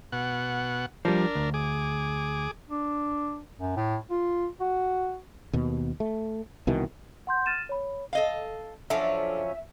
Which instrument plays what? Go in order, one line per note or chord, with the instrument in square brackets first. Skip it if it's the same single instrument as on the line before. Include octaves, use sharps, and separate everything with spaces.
[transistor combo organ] B2 F#5
[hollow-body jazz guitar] F3 G3 [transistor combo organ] D4 A#4
[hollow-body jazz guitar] D2
[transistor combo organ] G#4 D6
[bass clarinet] D4
F#2
A2
F4
F#4
[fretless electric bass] D#2 B2
A3
C2 B2 D#3 E3
[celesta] F#5 C6 G6
F6 A6 D#7 E7
C#5 B5
[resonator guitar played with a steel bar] A4 D#5 F5
[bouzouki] F3 F#3 C#4 [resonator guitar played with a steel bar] D4 A4 [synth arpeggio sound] E5